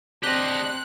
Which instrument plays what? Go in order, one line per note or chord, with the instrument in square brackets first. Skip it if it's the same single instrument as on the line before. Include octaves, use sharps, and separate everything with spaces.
[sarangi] C4 [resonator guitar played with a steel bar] D4 G#4 [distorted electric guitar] G4 D#5 [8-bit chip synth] F#6